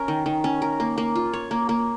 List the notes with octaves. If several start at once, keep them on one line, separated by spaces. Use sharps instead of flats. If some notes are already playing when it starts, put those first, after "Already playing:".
Already playing: C#4 A#4
D#3
D#3
C#4
A#4
A#3
A#3
F4
C#5
A#3
A#3